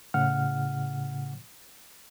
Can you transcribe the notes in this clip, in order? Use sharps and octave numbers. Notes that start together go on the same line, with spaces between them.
A2 C#3 F#5 F6